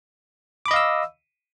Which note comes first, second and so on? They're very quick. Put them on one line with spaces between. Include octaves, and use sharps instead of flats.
D6 B5 D#5 F5 E6